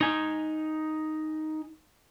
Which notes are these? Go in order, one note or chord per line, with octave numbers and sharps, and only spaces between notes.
D#4 G#5